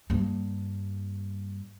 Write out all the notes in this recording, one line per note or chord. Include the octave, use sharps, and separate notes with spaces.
G2 A#3